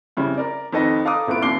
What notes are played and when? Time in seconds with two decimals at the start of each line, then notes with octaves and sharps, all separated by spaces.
0.17 F2 C#3 G3 E4
0.37 A#4 D5
0.73 F2 D#3 A4 B4 D#5
1.05 A4 F5 A#5 D6 D#6
1.27 A1 A3 B3 F4 D7
1.42 F1 D#2 D6 C7 G7